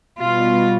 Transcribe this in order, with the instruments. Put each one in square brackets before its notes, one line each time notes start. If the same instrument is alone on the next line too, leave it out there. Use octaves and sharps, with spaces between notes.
[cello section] B2 G3 F4